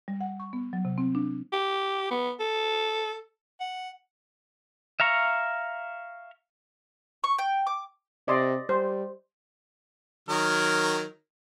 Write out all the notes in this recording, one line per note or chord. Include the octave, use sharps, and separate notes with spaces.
G3
F#5
C#6
B3
F#3
C3
C4
D4
G4
B3
A4
F#5
E5 F5 A#5 C#6
C#6
G5
D6
C3 D5 D#5 C6
G3 C5
D#3 F#3 A#4